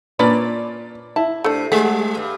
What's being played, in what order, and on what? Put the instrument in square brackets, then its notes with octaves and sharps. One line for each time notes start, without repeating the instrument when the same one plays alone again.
[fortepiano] A#2 [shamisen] C#4 D4 B4 [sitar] D5
[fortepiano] E4 [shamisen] A5
[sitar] C3 [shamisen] A3 D4
[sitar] G3 [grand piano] A3 [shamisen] G#4
[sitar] G2